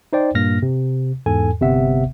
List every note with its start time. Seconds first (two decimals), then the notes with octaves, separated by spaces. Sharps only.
0.13 D#4 C5 D5 G5
0.34 G2 A#2 A#3 F6 A#6
0.62 C3
1.26 E2 G#2 A4 G#5
1.61 G1 C3 B3 E5 F#5